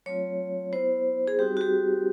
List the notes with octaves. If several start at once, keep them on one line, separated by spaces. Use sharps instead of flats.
F#3 A3 C4 F4 C#5
B3 E4 C5
G#4
G3 C4 D#4 F#4 G4
F#4
G4